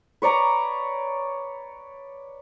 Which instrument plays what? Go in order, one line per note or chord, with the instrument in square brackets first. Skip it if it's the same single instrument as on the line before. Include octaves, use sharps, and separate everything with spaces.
[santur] B4 C#5 D5 A#5